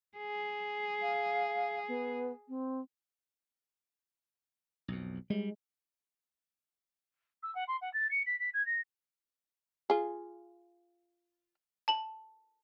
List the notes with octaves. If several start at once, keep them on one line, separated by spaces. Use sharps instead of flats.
G#4
F5
B3
C4
B1 F2
G3 G#3
E6
F#5
C6
F#5
A6
C#7
B6
B6
G#6
A#6
F4 G#4
A5 F#7